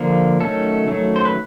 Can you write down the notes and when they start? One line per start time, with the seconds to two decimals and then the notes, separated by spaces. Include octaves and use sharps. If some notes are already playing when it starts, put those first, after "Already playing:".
Already playing: D3 F3 A#3
0.40 D#3 F#3 A3 C#4 A4
0.87 D#3 F#3 A3 C#4
1.16 C5
1.25 B4